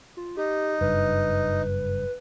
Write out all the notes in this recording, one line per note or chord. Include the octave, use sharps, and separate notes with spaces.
F4
D#4 G4
F#1 G2 B4